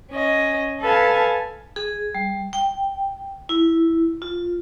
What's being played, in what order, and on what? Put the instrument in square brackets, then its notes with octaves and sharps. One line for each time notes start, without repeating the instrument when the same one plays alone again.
[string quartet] C#4 D#5
A4 B4 F5 G#5 A5
[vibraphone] G#4
G3
G5
E4
F4